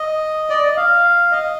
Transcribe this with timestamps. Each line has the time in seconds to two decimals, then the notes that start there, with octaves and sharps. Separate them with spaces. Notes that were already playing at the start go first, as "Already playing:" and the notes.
Already playing: D#5
0.50 D5
0.63 D#5
0.77 F5
1.31 D#5